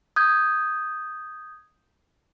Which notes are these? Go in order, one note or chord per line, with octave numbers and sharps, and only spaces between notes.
D#6 G6 G#6